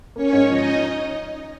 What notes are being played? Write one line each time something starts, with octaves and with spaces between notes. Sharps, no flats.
A#3 C#4 C#5
G#2
F3 D#4 D#5